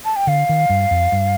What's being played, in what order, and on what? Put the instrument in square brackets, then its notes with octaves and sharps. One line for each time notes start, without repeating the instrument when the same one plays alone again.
[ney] A5
G5
[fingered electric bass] D3 [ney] F5
[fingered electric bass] D#3
G2
F2
G2